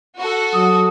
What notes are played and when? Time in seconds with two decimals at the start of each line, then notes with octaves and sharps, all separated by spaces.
0.18 F#4 A4
0.54 F#3 D#6